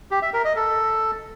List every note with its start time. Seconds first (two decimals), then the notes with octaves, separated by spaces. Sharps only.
0.11 G4
0.22 E5
0.33 A#4
0.45 D#5
0.56 A4